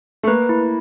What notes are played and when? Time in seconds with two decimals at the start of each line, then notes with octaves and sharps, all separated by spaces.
0.23 A3
0.27 A#3 B4
0.49 E4